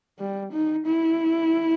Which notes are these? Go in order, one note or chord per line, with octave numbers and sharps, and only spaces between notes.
G3
D#4
E4